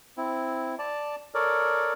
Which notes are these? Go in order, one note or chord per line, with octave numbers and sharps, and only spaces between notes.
C4 E4
D5 A5
A4 A#4 C#5 D5